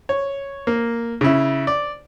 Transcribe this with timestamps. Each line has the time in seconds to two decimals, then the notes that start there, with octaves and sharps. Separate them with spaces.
0.09 C#5
0.67 A#3
1.21 C#3 E4
1.67 D5